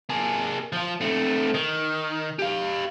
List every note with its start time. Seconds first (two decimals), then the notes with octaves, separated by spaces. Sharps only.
0.10 A#3 G#4
0.72 F3 F4
1.01 A3 C4
1.54 D#3
2.39 G4 F5